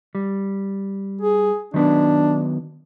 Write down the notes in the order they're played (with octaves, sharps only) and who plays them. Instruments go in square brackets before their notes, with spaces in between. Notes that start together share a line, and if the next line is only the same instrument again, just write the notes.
[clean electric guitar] G3
[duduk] G#4
[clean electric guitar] D#3 F#3 B3 [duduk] D4